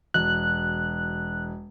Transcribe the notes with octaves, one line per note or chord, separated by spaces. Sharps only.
E1 F#6